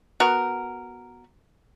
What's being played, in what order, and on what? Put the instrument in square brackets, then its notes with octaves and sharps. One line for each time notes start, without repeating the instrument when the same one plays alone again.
[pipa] B3 F#4 A#4